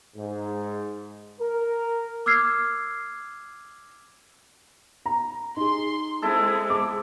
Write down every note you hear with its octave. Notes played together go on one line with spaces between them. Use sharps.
G#2
A#4
D6 E6 F6 G#6 C7
A#5
D#4 G#4 C6
G#3 C4 E4 A4
D6